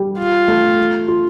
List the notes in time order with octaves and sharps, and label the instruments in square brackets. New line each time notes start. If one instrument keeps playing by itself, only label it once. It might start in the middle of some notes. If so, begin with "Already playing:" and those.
Already playing: [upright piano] G3
[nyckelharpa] F4
[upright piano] A3
F4